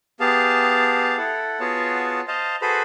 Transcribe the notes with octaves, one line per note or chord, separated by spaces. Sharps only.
B3 G4 G#4 F5 A5
E4 A4 F#5
B3 F4 F#4 G#4 C#5 A5
C5 D#5 F5 A5
F#4 G#4 A4 B4 C5 B5